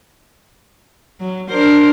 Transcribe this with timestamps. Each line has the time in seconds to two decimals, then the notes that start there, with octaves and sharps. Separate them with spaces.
1.20 F#3
1.50 D4 A#4 C5